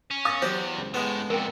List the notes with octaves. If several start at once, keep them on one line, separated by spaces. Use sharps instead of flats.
C#4
F5 D#6 A6 A#6
E2 F#3 G4 C5
C#2
A2 G#3 B3
F2 A#2 A#4 G5